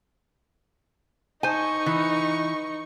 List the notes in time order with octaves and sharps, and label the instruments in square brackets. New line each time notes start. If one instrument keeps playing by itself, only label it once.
[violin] D#4 C#6 [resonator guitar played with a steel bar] C5 G#5
[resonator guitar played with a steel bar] E3